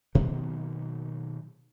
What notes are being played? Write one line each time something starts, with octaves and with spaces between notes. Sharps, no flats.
B2 D#3 F#3 A#3